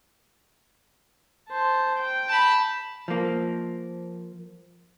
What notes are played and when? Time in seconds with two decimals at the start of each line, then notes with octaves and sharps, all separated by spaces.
1.49 C5 A5
1.97 G5
2.29 A5 B5
3.08 F3 A#3